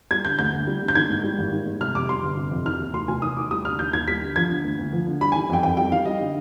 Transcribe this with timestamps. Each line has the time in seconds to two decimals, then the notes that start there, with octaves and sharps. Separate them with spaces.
0.11 G3 G#6
0.25 D3 G6
0.39 D2 G6
0.53 D2
0.67 G3
0.81 D3
0.88 G6
0.95 D#3 G#6
1.10 G#2
1.24 G3
1.38 G#1
1.52 D#3
1.66 G#2
1.80 C3 F6
1.95 F2 D6
2.09 G3 C6
2.23 G1
2.37 C3
2.51 F2
2.66 D#3 F6
2.80 D#2
2.94 F1 C6
3.08 F1 G#5
3.22 D#3 D#6
3.36 D#2 D6
3.51 G3 D#6
3.65 D3 F6
3.79 D#2 G6
3.93 D#2 G#6
4.08 G3 B6
4.22 D3
4.36 F3 G#6
4.50 D3
4.64 D2
4.79 D2
4.93 F3
5.07 D3
5.21 G3 B5
5.32 G#5
5.35 D#3
5.49 F2 G5
5.63 F2 G5
5.77 G3 G5
5.92 D#3 F5
6.05 G3 D#5
6.21 D3